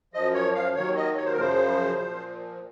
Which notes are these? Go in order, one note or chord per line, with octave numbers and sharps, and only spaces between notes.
F#2 F3 D#5
C#5
F5
D#2 D#3 F#3 C#5
D#5
C#5
C5
A#4
F#2 C#3 F3 C5
A#2 F3